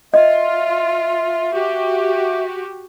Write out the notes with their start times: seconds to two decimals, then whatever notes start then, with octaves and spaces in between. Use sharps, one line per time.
0.14 F4 D#5 E5
1.53 F#4 G4